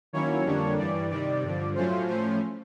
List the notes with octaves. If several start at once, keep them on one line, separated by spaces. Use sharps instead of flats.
D#3 F#3 A#3 C#4 E4 C#5
F2 D3 G3 A#3 D4
G2 E3 G3 D5
C3 D#3 G3 D5
G2 D3 F3
A2 F#3 A3 C#4 F4 C5
A2 F3 A3 C#4 C5